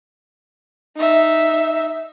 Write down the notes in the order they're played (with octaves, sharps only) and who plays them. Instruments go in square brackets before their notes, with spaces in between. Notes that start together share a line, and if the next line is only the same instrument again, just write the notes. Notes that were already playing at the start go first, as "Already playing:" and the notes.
[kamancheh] D#4 E5